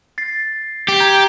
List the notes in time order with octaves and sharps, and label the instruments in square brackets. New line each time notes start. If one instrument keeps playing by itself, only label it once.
[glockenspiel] A6 C7
[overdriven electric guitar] G4
[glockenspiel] A#5 G6 G#6